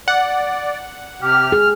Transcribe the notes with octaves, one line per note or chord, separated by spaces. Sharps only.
D5 F#5
C3 G4 F6
G#4